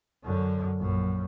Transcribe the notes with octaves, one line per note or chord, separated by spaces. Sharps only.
F#2 D3
A#1 F#2